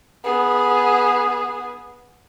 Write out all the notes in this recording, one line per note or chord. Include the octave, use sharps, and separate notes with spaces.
B3 G#4